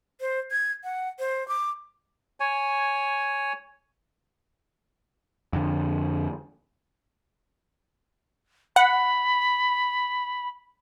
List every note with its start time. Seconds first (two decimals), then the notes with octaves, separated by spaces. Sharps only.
0.21 C5
0.51 G#6
0.84 F#5
1.19 C5
1.48 D6
2.40 C#5 G#5
5.53 F2 D3
8.76 F#5 B5